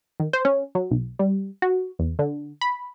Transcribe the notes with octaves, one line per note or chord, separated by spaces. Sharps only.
D#3
C5
C#4
F#3
B1
G3
F#4
E2
D3
B5